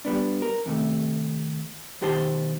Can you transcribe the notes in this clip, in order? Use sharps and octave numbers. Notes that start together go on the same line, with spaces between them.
G3 G#3 B3 D4
A#4
D#2 C3 A3
B1 D#3 G4 C5 A5 C6